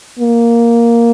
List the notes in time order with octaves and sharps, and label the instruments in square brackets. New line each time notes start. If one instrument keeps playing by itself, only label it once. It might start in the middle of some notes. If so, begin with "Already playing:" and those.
[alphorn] A#3